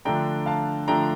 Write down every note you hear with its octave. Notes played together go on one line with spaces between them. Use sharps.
D3 F3 A3 D4 G5 A#5
F5 A5
D3 F3 A3 D4 G5 A#5